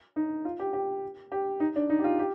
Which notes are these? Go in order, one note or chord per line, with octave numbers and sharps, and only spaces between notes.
D#4
F4
G4
G4
G4
D#4
D4
D#4
G4
F4
G4